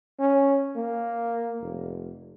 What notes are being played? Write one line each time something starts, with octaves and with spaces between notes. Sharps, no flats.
C#4
A#3
F1